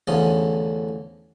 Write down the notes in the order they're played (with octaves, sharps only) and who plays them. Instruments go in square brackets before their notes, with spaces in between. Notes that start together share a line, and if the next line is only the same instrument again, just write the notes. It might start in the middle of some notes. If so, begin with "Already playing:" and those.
[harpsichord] A1 E2 D3 F3 C#4 D#6